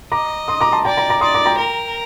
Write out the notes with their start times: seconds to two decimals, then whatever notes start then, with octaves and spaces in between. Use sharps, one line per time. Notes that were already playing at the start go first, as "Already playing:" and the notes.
0.12 D#5 A#5 D6
0.48 C6 D#6
0.61 A#5 D6
0.72 A5 C6
0.85 D5 G5 A#5
0.97 G5 A#5
1.09 A#5 D6
1.21 D5 C6 D#6
1.34 A#5 D6
1.46 G5 A#5
1.58 A#4